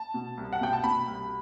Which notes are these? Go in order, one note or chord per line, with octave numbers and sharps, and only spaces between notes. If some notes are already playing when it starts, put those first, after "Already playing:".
Already playing: A5
B2
C2
F#5
B2 G5
A5
B2 B5
C2